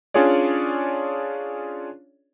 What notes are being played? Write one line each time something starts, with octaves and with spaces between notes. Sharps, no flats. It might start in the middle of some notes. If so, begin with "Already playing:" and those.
C#4 D4 F4 G#4 C#5 D5